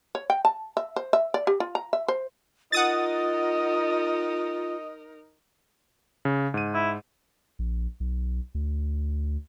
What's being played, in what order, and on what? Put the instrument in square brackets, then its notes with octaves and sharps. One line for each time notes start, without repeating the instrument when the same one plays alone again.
[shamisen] C#5
G5
A5
E5
C5
E5
D5
G4
F4
A#5
E5
C5
[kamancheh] D#4 A#4 [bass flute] F4 [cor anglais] D#5 [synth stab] F#5 D#6 A6
[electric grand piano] C#3
G#2 D#7
[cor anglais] E4
[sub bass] A#1
B1
D2